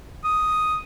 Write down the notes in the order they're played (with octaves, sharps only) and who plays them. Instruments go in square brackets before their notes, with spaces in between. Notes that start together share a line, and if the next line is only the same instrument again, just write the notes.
[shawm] D#6